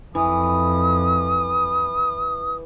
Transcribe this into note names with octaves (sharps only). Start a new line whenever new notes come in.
F2 E3 D#6